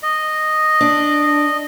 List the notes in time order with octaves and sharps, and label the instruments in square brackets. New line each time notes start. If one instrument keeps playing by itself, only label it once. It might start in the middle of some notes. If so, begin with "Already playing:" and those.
[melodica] D#5
[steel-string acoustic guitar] D4